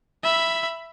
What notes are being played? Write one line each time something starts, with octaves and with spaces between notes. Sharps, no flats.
E5 B5